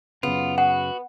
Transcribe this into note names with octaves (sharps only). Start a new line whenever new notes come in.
F#2 C#3 B3 F4
F#4 F#5